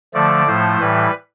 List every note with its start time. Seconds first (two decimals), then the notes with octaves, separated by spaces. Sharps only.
0.14 D3 F3 A3 D5
0.46 A2 F3 A3 C5
0.80 A2 E3 G3 B4